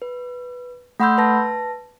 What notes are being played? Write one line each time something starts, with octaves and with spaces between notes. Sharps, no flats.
B4
A3 F#5 B5 C6 E6 G6
B4 A5 A#6